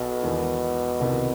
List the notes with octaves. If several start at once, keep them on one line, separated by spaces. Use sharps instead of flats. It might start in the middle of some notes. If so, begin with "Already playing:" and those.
Already playing: B1 B2
E1 E2 D#3
C2 C3 D#3